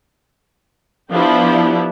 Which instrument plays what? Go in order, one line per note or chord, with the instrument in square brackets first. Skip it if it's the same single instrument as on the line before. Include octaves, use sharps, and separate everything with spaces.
[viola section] F3 B3 D4 E4 G4